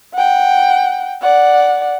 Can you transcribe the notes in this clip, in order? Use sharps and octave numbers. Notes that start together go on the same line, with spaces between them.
F#5 G5
D5 F#5